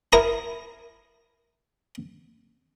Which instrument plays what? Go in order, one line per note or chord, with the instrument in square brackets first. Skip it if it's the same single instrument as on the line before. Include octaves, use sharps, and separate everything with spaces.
[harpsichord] E4 A#4 A#5 D#6